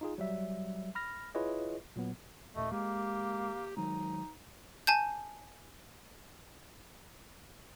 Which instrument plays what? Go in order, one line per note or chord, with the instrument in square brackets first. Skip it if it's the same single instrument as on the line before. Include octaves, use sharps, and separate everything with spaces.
[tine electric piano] D#4 F4 G#4
F#3 G3 E5
B5 F6 A#6
E4 F4 G#4 B4 C#5 D#5
A#2 F#3 B3
[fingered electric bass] D#2 A#2 [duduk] A3 [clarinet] D#5
[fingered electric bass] G#3 [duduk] A#3 [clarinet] G4
[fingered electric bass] D#3 F#3 G#3 [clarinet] D#4
[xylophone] G#5 A5 G6